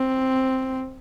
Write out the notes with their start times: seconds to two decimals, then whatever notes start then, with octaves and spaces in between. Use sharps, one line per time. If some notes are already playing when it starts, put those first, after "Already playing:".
Already playing: C4